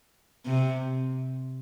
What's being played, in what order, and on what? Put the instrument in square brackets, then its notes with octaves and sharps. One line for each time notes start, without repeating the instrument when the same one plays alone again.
[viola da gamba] C3